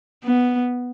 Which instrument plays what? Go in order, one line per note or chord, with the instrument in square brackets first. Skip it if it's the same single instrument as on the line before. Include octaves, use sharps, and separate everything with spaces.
[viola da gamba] B3